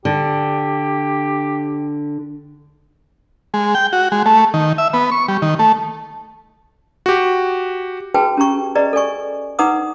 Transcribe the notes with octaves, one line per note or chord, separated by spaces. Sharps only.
D3 G4
G#3
G5
F#4
G#3
A3
D#3
E5
B3
C#6
G3
D#3
A3
F#4 G4
F#4 G#4 B4 G5 A5
C#4 G4 A#5 C#6
G#4 B4 D5 D#5 A#5
A4 D5 G#5 C#6
D#4 B4 F#5 A#5 D6 D#6